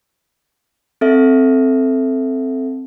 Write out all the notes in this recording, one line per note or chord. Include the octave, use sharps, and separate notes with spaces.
C4 A4 E5